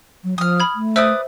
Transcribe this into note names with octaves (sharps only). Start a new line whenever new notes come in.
F#3
F3 D#6 F6
B5 G#6
A3
B4 C5 D5 E5 D#6 E6